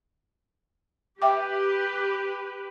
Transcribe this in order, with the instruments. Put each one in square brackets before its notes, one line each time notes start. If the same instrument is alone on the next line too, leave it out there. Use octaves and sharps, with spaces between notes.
[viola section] G4 B4 [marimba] E5 G5 D6